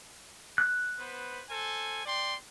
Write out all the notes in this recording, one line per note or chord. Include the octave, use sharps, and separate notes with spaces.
F#6
B3 B4 C5
A4 C5 G#5
D5 G5 C6